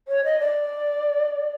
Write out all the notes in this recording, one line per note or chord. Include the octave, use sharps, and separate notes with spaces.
C#5
D#5
D5